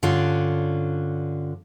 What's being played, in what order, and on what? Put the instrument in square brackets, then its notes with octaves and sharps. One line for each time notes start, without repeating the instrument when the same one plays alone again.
[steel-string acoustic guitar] G2 D3 C#4 D4 F4